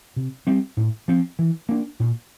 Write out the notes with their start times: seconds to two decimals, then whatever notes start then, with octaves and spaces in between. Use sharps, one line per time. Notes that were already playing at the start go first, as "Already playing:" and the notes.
0.16 C3
0.47 G3 C4
0.77 A2
1.08 F3 C4
1.39 E3
1.69 A#3 D4
2.00 A#2